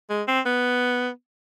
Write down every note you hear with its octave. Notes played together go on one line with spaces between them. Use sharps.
G#3
C4
B3